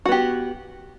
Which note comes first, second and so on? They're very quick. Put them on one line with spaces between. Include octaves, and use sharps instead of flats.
F#4 B3 G4